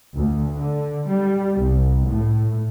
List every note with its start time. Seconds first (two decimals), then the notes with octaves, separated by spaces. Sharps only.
0.15 D2
0.58 D3
1.09 G3
1.60 C2
2.07 A2